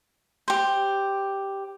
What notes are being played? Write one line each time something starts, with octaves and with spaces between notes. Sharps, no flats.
G4 C5